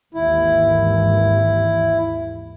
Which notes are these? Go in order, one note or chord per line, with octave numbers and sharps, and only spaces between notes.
G#1 D#2 E3 E4